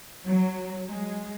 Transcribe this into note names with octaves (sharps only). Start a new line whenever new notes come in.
F#3
G#3